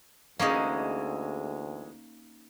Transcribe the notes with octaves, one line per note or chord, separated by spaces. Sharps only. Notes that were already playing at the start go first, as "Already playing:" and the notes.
D2 E3 G#3 A#3 C#4 D#4